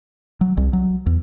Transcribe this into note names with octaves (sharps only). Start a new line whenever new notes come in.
F#3
C2
F#3
E2